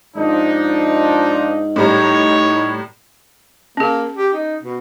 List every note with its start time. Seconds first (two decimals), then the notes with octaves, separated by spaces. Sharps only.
0.16 G#2 F3 D4 D#4
1.76 A2 G3 D#4 C#5 A#5
3.77 A#3 C#4 G#4
4.17 G4
4.33 D#4
4.62 B2